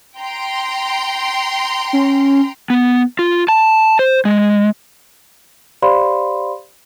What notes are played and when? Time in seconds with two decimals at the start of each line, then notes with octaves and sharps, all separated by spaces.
0.20 G5 A#5 C6
1.93 C#4
2.70 B3
3.19 F4
3.48 A5
3.99 C5
4.25 G#3
5.82 G4 C5 D5 F5 B5 C6